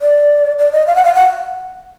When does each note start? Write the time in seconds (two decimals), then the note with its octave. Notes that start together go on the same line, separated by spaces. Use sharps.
0.02 D5
0.59 D5
0.73 D#5
0.87 F5
0.96 F#5
1.05 F5
1.15 F#5